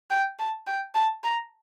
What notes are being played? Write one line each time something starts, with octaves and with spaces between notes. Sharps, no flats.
G5
A5
G5
A5
A#5